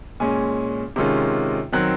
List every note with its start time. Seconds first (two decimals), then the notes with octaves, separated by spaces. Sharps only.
0.20 A#2 G#3 C#4 G#5
0.96 C3 D#3 G#3 C#4 F4
1.72 D#3 F#3 C4 F#6